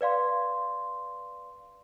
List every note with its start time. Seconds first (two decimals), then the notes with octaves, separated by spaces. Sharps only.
0.01 B4 D5 F5 C6